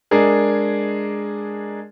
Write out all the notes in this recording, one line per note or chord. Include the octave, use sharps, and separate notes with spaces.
G#3 D4 G#4 A#4